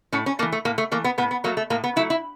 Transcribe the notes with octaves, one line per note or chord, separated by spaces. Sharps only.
A2 C#4
C#4
E3 A3 A#3
A3
A2 A#3
A3
E3 A3 A#3
B3
A2 B3
B3
F#3 A3 A#3
A3
A2 A#3
B3
F#3 A3 E4
E4